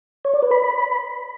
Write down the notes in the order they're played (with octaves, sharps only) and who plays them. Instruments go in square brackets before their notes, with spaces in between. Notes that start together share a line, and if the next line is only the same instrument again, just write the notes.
[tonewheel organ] C#5
D5
B4
B5